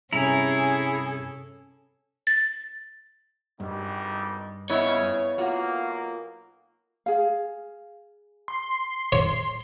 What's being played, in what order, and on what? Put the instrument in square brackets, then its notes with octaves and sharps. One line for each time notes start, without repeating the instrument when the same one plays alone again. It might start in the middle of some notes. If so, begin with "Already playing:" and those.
[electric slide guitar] G2 C3 G3 [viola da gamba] C#4 A4 [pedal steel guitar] E4 A#5 [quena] G#4
[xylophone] A6
[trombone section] G#1 G3 D#4 [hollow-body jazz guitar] G2
[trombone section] F2 C#3 [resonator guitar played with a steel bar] B3 E4 D#5 [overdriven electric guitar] C#5
[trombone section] B1 A#3 [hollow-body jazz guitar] F4 F#4
[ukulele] G#4 F5
[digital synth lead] C6
[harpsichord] C#5